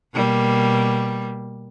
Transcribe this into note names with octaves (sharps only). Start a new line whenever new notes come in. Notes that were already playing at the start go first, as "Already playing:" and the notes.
B2 G3 A#3